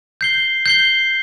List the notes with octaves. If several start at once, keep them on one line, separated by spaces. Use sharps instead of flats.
G6 C7 G7
G6 C7 G7